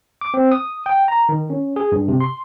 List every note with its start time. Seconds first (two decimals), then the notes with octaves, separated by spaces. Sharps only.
0.21 D6
0.34 C4
0.52 D#6
0.86 G5
1.08 A#5
1.29 D#3
1.50 C#4
1.76 G#4
1.92 G2
2.08 C3
2.20 C6